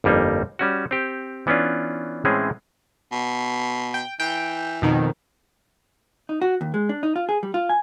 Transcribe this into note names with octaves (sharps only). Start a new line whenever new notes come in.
G1 F2 G3 A#3 D#4
G3 C#4 F#4
C4 G4
E3 B3 C#4 D4 F4
A2 E3 G#3 C4 C#4 G#4
B2
G5
E3 G5
F2 B2 D#3
D#4
F#4
D#2
G#3
D4
D#4
F4
G#4
G3
F4
G#5